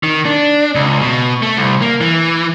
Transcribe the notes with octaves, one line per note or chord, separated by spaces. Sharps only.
D#3
D4
C#2
B2
A3
C2
A#3
E3